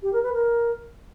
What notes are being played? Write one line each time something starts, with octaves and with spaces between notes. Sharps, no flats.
G4
A#4
B4
A#4